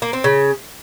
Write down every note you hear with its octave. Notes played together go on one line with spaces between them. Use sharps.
A#3
C4
C#3